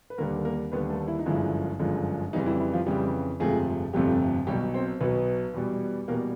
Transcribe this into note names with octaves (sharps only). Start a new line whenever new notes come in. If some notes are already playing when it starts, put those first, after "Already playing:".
B4
D#2 D3 G3 A#3 A#4
A#3 A#4
D#2 D3 G3 B3 B4
A3 A4
E4
D#4
G1 F#2 D3 F3 G#3 E4
G1 F#2 D3 F3 G#3
F2 C#3 E3 G3 D#4
E4
E4
F3 F4
F2 C#3 E3 G3 G4
G1 F2 C3 F3 G#3 A3 G#4
G1 F2 C3 F3 G3 A3 G4
B1 B2 F#3 G3 G4
C4 C5
B1 B2 F#3 B3 B4
E2 B2 G3
E2 B2 G3 A#3 A#4